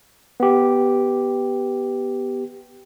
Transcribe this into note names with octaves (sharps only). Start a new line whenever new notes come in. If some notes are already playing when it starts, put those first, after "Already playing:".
B3 G4